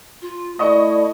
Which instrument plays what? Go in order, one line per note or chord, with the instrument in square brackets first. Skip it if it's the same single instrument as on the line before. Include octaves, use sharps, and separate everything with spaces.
[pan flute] F4
[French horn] A3 [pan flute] E4 [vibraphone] D5 [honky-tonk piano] D#5 C#6